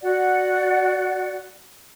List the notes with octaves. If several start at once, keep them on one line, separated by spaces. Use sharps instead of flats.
F#4 D5 F#5